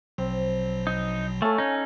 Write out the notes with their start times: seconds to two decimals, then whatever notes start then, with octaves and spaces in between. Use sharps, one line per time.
0.18 A#1 B2 F#3 C4
0.87 D#4
1.42 A3 A4 C#5 F5 G#5
1.58 C#4 D#4